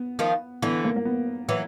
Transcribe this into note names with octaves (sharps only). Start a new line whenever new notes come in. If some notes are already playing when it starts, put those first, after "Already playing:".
Already playing: B3
D#3 F3
D3 E3 B3
A#3
A#3
B3
E3 F#3